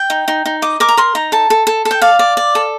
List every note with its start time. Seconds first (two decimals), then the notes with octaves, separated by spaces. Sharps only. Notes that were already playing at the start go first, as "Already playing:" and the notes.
Already playing: G5
0.10 D#4
0.28 D#4
0.46 D#4
0.62 D#5 D6
0.80 A#4 D6
0.89 A#5
0.97 A#4 C6
1.15 D#4 A#5
1.32 A4 A5
1.50 A4
1.67 A4
1.85 A4
1.91 G5
2.02 D5 F5
2.19 D5
2.37 D5
2.55 A4